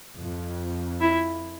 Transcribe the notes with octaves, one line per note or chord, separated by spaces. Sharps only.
F2
E4